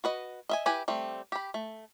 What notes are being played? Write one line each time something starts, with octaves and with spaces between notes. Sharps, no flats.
F#4 B4 D#5
D#5 E5 G#5
E4 G4 B4 G#5
G3 A3 C4
G4 B5
A3